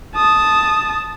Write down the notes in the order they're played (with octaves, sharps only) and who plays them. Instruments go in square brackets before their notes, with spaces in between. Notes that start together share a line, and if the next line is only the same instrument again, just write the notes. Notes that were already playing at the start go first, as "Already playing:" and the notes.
[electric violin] A5 D#6